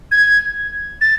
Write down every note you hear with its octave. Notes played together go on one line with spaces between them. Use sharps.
G#6
A6